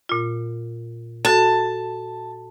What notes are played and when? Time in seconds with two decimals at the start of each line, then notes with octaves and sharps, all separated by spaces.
0.09 A#2 F4
1.25 F#4 A4 A5